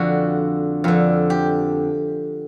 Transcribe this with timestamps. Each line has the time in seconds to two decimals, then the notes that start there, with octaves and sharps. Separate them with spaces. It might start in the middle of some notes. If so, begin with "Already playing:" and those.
Already playing: F2 D3 F#4
0.84 F2 D3
1.30 G4